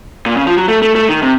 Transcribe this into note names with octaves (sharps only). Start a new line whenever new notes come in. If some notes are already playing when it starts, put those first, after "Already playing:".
A#2
C#3
F3
F#3
A3
A3
A3
D#3
C3